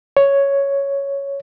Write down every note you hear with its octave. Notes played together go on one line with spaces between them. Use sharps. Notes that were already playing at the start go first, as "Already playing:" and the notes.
C#5